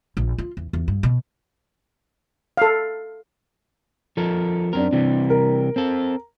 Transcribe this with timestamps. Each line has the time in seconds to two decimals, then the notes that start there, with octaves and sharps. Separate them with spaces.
0.17 A#1
0.38 F4
0.57 E2
0.73 E2
0.88 G2
1.03 B2
2.57 A4 F5
4.17 F3 A4 A#4
4.73 F#2 C4 D4 A#4
4.93 C3 E3 G3
5.30 A#4
5.76 C4 A4